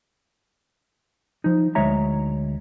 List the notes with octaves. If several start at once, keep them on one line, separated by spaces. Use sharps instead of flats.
F3 D#4
D2 G#3 C#5 E5 A#5